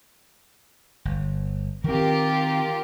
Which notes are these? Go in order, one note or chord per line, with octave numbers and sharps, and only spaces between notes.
G1
D#3 C4 F4 G4 A#4